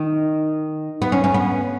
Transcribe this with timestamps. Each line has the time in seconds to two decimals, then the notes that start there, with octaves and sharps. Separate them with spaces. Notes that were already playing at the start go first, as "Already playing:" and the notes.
Already playing: D#3
1.02 B3
1.12 C#4
1.24 C#4
1.34 B3